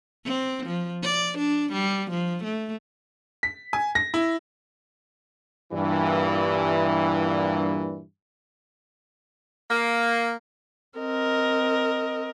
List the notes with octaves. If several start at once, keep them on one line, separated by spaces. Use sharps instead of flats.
C4
F3
D5
D4
G3
F3
A3
B6
G#5
A#6
E4
G2 A#2 E3
A#3
C4 A#4 D#5